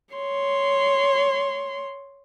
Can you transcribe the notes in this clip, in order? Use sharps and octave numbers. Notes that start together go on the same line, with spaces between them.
C#5 C6